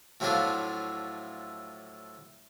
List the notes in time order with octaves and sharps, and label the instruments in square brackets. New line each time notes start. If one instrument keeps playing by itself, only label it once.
[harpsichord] A2 F3 F#3 A3 D4 F4